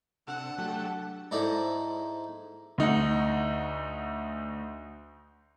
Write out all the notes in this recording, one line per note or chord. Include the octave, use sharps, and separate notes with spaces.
C3 D4 A4 F#5 E6
F#3 A3 G4 A4
G#2 D#4 E4 A4 C5 D5
D2 D#4 F#5